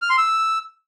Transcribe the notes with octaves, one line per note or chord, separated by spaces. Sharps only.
F6
C6
E6